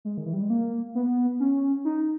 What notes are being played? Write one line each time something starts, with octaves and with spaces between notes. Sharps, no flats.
G#3
D#3
E3
G3
G#3
A#3
B3
C#4
D#4